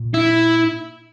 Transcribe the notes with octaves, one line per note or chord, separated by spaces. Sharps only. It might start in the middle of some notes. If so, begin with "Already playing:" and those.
Already playing: A#2
E4